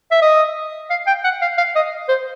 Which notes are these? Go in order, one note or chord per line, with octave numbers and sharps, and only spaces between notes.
E5
D#5
F5
G5
F#5
F5
F5
D#5
C5